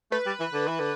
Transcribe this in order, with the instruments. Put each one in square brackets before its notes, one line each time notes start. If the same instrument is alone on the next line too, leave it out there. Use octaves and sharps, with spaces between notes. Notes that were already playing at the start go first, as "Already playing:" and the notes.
[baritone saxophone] A3 [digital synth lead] B4
[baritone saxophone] G3
E3
D3
E3
D3